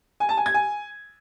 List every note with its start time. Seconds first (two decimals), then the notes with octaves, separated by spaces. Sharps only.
0.20 G#5
0.29 A5
0.37 G#5
0.46 G#6
0.54 G#5